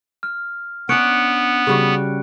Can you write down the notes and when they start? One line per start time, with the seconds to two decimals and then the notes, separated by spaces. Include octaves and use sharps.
0.23 F6
0.89 B3 C#4 D4 F#6 C#7 D7
1.67 C#3 G3 F#4